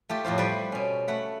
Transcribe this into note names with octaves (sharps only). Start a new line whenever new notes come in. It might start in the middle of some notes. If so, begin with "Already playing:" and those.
A3 F4 G4
F2 A2 F4 C5
G3 A3 B4 C5 D5
B2 C#4
A3 F#5 B5